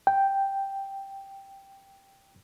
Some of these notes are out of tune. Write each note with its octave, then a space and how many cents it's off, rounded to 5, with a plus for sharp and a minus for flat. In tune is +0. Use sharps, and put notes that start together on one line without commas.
G5 +0